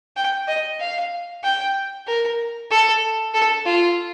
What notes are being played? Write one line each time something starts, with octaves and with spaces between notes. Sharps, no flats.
G5
D#5
F5
G5
A#4
A4
A4
F4